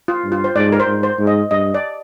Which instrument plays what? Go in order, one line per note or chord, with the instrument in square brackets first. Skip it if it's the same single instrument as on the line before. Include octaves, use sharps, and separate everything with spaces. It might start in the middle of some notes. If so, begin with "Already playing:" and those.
[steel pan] F4
[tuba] G2
[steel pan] F4
C5
[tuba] G#2 [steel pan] D5
[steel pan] A#4
C5
[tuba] G#2
[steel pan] C5
[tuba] G#2
[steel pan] D#5
[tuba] G2 [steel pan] D#5
[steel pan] D5